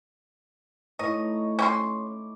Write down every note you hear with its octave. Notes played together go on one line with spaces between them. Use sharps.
A2 D#4 C#5 D#5
C#4 G5 C6 D6